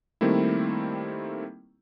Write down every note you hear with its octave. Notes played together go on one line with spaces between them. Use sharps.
D#3 G3 A3 A#3 C4 E4